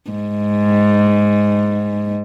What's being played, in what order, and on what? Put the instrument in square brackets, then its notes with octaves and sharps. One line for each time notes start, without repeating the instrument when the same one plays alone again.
[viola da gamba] G#2